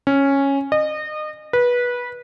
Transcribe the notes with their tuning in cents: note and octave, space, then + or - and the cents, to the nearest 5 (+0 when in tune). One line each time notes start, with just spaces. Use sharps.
C#4 -5
D#5 -30
B4 -20